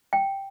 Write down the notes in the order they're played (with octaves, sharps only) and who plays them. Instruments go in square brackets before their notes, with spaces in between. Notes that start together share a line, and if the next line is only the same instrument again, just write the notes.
[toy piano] G5